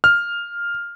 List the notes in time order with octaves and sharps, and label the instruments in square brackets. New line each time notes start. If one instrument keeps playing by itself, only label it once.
[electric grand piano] F6